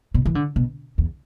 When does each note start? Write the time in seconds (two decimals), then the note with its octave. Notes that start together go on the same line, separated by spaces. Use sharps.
0.14 B2
0.26 E3
0.35 D3
0.56 B2
0.98 E2